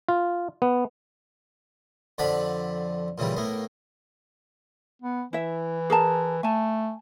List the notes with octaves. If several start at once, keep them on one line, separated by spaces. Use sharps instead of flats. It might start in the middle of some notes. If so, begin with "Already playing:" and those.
F4
B3
F2 D3 F3 D5 F#5 B5
A#2 C#3 E3 G3
A2 A#3 B3
B3
E3 E4 E5
G#4 A#4 A5
A3 G#5 A5